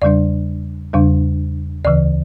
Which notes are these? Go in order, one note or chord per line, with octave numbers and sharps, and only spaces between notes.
E2 C#3 G3 D4 D5
E2 C#3 G3 D4
D2 C#3 E3 D5